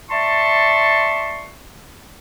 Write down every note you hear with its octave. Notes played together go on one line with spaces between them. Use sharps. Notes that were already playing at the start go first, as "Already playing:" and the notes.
D5 E5 A5 C6 C#6